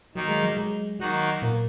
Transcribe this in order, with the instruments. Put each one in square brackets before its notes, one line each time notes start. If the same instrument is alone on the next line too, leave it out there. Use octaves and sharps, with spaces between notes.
[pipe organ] D#3 A#3 D#4 [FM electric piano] F#3
[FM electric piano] G#3
F#3
G#3
[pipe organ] D#3 A#3 D#4 F#4 [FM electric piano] F#3
[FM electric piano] A#2 A#3